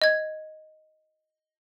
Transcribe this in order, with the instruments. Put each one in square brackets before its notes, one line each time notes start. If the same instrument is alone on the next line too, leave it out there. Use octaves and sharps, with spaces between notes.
[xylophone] D#5 G#6